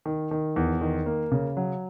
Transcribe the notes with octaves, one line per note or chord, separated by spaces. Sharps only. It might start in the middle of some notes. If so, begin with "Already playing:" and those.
D#3
D#3
E2
D#3
A#3
C#3
F#3